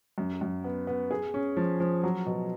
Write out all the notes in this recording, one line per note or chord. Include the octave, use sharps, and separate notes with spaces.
F#2
F#2
B3
B3
G#4
C#4
F3
F3
F#3
B2